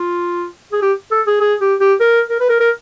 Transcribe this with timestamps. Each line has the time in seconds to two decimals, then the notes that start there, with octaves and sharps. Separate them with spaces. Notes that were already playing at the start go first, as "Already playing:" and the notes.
Already playing: F4
0.72 G#4
0.82 G4
1.11 A4
1.27 G#4
1.41 G#4
1.61 G4
1.80 G4
2.00 A#4
2.30 A#4
2.40 B4
2.49 A#4
2.60 A#4